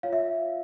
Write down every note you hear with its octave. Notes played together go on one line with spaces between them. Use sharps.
F4 C#5 F5
E5